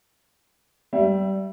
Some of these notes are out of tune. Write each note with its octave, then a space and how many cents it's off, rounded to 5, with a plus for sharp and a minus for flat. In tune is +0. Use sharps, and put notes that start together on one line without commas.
G3 -20 E5 +15